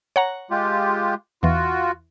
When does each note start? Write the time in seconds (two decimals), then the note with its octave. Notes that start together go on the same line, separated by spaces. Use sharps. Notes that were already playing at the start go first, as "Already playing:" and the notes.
0.16 C#5 F#5 A#5
0.51 G#3 F4 G4
1.43 E2 E3 F4 F#4